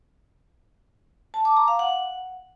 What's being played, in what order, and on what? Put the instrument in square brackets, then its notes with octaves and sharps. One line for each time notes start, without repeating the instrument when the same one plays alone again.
[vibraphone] A5
D6
A#5
F5
F#5